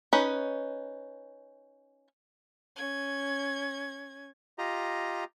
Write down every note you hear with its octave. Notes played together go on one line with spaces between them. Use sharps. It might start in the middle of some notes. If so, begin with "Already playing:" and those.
C#4 D#4 B4
C#4 G#6
F4 G4 D#5 A#5